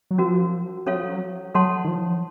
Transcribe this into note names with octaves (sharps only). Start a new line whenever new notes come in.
F#3
F3 C#4 F#4 A#4
F#3 C#4 A4 C#5 F5
F3
F#3
F#3 A4 C#5 F#5 A5 C6
D#3
F3